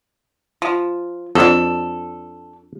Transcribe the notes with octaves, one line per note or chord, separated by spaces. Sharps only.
F3
F2 D4 A4